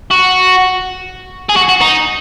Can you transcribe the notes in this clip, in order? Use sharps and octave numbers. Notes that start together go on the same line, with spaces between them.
F#4
G#4
F#4
F#4
D#4